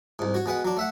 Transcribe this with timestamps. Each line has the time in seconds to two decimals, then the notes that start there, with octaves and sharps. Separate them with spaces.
0.19 C2 G#2
0.34 F#4 C#5
0.46 B2 G#3 B4 F#5
0.65 F#3 D4
0.77 A3 E5 F#5